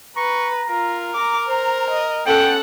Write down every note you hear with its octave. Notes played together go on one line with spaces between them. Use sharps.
B4 A#5 C#6
F4 A#4
A#5 D6
C5 A#5
D#5
B3 C#4 A4 F#5 G5 A5